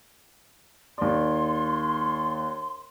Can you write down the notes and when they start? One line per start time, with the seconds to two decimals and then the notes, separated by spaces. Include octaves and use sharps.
0.98 D#2 D5 C6